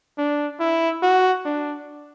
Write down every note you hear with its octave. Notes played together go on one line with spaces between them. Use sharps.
D4
E4
F#4
D4